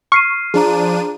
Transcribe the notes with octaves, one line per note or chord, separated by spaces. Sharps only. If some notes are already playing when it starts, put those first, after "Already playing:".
C#6 F6 C7 D#7
F3 D4 G#4 A#5 D#7